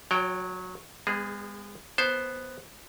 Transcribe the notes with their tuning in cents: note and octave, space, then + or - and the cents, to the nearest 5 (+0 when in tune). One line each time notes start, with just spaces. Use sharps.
F#3 -20 C#5 +30 G5 +0
G#3 -35 B3 +20 G#4 +0
B3 +0 C5 +0 A5 +0